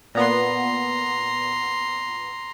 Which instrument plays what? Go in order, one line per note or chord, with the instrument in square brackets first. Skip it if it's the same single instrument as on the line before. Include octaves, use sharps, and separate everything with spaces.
[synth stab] A#2 B3 [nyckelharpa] A#5 C6